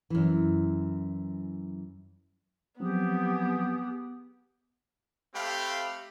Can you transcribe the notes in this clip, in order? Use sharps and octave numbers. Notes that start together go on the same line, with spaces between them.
F#2 E3
F3 F#3 B3 C4 G4 G#4 D#6
A3 C4 G4 F5 G5 B5